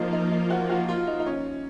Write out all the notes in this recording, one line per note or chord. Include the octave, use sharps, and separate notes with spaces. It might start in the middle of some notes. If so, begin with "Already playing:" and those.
Already playing: F3 A#3 D#4 F4
D#4
D#4
F#4
F#4
F4
D#4
D#4
C#4